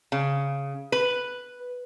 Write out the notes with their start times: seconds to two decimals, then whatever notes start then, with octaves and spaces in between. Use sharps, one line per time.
0.12 C#3
0.92 B4